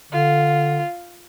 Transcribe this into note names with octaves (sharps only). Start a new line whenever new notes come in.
D3 F4